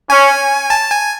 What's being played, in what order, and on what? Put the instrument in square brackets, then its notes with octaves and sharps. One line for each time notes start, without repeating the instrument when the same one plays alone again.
[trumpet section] C#4 [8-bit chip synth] G#5
[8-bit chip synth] A5
G#5